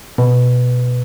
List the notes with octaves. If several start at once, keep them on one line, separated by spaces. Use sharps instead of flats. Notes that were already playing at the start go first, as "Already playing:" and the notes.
B2